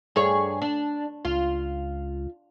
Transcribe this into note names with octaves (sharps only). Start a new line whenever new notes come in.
G2 G#4 C#5
D4
C#2 F4